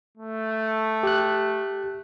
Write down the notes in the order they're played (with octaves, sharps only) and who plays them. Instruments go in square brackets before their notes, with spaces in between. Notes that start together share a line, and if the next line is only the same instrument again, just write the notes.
[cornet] A3
[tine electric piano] G4 F#6